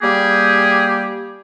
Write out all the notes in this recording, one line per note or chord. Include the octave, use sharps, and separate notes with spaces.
G3 A#3 G4 G#4